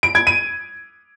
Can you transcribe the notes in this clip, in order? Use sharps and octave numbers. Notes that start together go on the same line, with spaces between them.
D7
G#6
D#7